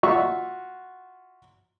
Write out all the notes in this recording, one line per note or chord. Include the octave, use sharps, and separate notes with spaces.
F4 F#4 E5 C#6